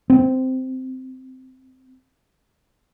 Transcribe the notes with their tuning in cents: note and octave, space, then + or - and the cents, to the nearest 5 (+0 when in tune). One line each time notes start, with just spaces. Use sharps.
C4 -10